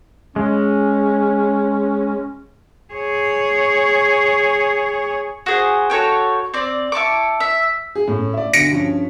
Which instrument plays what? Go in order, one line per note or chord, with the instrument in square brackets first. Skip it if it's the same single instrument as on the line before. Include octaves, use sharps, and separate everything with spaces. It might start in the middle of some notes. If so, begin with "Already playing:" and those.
[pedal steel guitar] G#3 [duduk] C#4
[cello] G#4 C#5
[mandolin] F#4 G#4 C5
F#4 A4 C#5 G5
C4 D5
E4 A5 C#6 D6
E5
[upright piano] G#4
A2 C#4
D5 E5
[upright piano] B1 D3 B6 [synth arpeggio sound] A#6 C#7 D7
[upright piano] G2 F3 C#4